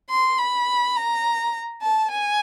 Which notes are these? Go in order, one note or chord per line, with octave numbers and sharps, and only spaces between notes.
C6
B5
A#5
A5
G#5